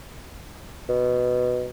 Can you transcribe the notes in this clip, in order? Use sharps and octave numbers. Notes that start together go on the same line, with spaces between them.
B2